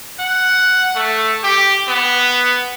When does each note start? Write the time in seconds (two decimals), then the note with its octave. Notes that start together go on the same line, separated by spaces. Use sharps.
0.19 F#5
0.95 A3
1.43 G4
1.88 B3